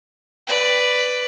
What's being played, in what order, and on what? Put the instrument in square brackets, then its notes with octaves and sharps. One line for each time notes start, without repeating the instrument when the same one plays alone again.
[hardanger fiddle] B4 D5